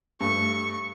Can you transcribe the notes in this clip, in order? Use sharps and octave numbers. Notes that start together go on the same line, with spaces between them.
G2 A3 C#6